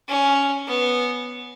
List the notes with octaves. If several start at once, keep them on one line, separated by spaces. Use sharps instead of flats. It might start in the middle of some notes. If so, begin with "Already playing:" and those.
C#4
B3